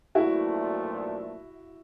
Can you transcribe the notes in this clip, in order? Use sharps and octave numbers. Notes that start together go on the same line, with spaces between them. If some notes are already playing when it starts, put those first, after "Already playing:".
B1 A#2 F3 A3 D4 E4 F#4